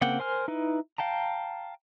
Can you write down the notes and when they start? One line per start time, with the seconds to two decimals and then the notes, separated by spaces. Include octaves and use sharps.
0.01 C#3 A#3 C4 F#5 G5
0.19 A#4 C5 G#5 F6
0.48 D#4 E4 B4
0.98 F5 G5 A5 A#5